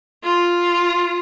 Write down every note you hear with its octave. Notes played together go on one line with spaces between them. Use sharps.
F4